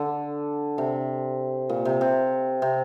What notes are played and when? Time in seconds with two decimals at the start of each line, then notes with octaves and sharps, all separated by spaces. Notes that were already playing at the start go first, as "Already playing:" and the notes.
Already playing: D3
0.78 C3
1.69 A#2
1.85 C3
2.01 C3
2.62 C3